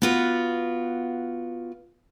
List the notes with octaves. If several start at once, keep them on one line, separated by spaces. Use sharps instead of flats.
B3 F4 F#4